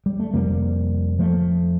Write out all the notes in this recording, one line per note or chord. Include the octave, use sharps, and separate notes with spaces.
G3
A3
F2 C3 G3 A#3
F3 A3